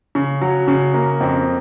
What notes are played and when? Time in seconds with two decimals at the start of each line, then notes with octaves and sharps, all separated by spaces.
0.15 C#3
0.41 F#3
0.68 C#3
0.94 A#3
1.20 F2